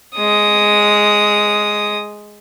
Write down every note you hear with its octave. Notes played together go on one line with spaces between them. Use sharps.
G#3 D#6